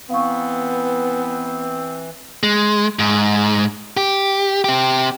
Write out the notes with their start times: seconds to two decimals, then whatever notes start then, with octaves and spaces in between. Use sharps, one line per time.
0.10 E3 B3 C4 F5 C#6
2.43 G#3
2.99 G#2
3.97 G4
4.64 C4 G4